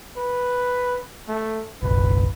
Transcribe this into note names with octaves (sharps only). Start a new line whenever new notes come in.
B4
A3
F#1 B1 B4